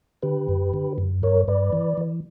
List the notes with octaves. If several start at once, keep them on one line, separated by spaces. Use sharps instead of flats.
D3 G4 B4
F#2
D3
F#2
G2 A#4 C#5
G2 B4 D5
E3
E3